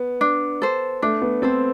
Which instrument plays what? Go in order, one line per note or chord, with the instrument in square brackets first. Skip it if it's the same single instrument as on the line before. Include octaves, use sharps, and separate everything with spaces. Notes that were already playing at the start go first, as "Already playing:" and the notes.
Already playing: [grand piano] B3
[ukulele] D4
A4 C5
[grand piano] A3 [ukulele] D4
[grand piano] B3
[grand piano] C4 [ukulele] A4 C5